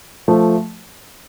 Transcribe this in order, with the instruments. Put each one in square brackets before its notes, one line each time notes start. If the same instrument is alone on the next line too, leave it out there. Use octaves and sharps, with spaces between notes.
[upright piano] F3 A3